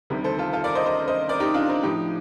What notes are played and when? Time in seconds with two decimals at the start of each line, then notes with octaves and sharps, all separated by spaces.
0.10 D2 C3 D#3 G3
0.24 A4 C5
0.38 F4 A4
0.53 F4 A4
0.64 A#4 D5
0.75 C5 D#5
0.86 C5 D#5
1.08 C5 D#5
1.29 A#4 D5
1.40 D#4 G4
1.54 D4 F4
1.68 C4 D#4
1.83 A2 F3 D#4 G4